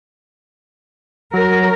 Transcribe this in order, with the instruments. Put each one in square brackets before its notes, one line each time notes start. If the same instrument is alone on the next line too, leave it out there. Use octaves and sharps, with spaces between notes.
[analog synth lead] F#3 [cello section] A#4